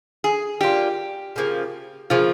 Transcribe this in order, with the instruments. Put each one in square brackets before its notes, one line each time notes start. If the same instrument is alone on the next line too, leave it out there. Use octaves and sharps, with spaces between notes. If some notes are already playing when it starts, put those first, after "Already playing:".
[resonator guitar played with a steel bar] G#4
[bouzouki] G3 A#3 F4 [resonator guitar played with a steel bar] G4
[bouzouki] C#3 F3 A#3
[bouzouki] C#3 F3 A#3 [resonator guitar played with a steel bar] F4